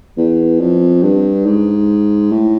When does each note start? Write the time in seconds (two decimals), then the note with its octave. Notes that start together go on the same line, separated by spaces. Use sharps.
0.17 E2
0.60 F2
1.03 G2
1.45 G#2
2.32 A2